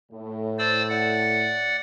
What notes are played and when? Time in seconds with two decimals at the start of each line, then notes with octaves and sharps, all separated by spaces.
0.12 A2
0.58 C5 D5 E6
0.90 D5 F#5